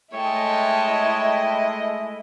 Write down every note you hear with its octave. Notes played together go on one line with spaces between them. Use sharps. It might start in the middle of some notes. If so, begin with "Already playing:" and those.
G#3 A3 E4 C#5 D#5 G5 A5